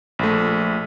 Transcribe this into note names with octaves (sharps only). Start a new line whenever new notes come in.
A#1 A3